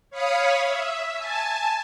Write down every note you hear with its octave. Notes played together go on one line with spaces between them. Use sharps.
C#5 F5 B5 C#6 D#6
E5
G#5 A5